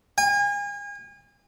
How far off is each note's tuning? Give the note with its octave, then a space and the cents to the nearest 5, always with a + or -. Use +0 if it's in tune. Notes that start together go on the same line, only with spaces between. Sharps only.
G#5 -35